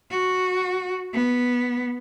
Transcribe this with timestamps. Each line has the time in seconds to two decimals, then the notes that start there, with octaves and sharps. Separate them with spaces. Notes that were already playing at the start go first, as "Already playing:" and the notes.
0.11 F#4
1.13 B3